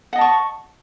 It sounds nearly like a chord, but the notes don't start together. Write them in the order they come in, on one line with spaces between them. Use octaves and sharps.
F#5 D#5 A5 C#6